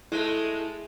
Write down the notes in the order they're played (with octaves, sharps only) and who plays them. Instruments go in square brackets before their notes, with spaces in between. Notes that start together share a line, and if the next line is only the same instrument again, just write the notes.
[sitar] G#3 [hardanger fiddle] A3 [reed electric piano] E4